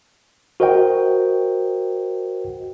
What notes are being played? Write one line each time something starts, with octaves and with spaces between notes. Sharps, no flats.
F#4 A#4 C5 D#5 F#5 G5